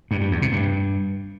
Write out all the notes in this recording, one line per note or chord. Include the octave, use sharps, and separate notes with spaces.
G2
G2
E2
C3
G2